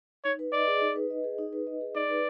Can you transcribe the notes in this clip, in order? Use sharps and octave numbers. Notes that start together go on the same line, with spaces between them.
D#4 C#5
B4
D5 D#5
G#4
D#4
B4
D#5
G#4
D#4
B4
D#5
G#4
D#4 D5
B4